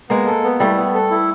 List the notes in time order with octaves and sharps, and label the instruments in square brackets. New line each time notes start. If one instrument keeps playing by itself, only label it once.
[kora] G#3 A#3 [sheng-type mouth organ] B3
[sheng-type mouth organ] A4
B3
[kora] G3 A3 [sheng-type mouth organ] E4
[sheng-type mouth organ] B3
A4
E4